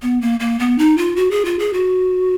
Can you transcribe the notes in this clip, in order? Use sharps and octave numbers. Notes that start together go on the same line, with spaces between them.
B3
A#3
A#3
B3
D#4
F4
F#4
G#4
F4
G#4
F#4